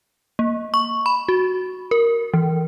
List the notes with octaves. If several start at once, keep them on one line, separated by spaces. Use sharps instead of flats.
A#3
C#6
B5
F#4
A#4
E3